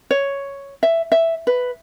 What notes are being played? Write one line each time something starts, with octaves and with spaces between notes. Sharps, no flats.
C#5
E5
E5
B4